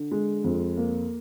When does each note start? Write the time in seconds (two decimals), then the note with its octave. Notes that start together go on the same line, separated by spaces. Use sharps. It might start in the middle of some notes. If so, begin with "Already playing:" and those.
Already playing: D3
0.11 G#3
0.44 F2
0.77 A#3